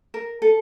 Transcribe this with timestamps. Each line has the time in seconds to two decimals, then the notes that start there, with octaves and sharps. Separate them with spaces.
0.14 A#4
0.42 A4